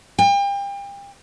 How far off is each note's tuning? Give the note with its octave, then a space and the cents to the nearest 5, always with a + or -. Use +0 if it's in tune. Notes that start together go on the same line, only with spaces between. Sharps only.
G5 +35